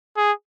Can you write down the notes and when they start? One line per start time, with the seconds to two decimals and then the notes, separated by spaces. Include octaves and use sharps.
0.17 G#4